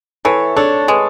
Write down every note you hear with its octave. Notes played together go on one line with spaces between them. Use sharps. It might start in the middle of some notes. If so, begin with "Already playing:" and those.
E3 A4 C#5
D4 A4 C#5
G#3 G#4 B4